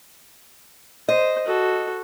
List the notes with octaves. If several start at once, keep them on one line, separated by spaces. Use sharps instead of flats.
C5 D#5
F#4 A4